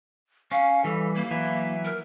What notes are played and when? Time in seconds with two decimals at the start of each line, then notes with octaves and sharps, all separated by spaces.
0.52 C#4 F5
0.84 E3 G3 A4
1.15 A#3
1.31 E3 F#3 E4
1.85 A#4